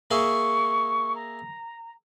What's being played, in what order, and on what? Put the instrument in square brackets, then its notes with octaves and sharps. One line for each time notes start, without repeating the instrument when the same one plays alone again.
[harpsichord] A#3 G#4 E5 [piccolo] C#6
[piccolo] A#5